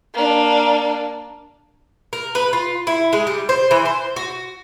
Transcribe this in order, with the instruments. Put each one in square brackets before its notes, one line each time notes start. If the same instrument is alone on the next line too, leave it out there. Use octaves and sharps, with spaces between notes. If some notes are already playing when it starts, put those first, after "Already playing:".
[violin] A#3 D4
[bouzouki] A#4
B4
F4
E4
G#3
G3
C5
E3
C5
F#4